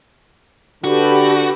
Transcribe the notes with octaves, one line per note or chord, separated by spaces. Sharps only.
D3 F#4 G4 A4 B4